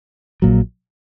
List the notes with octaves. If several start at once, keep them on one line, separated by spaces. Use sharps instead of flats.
A#1 A#2 F#3